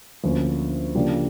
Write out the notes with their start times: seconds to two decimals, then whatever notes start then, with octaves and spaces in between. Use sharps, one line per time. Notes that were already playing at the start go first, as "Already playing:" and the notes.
0.24 D2 D3 F3 A#3 C#4
0.95 C#3 F3 A#3 D4 G4